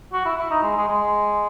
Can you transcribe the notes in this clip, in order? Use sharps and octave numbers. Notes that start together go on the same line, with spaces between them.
F#4
E4
E4
D#4
G#3
G#3
G#3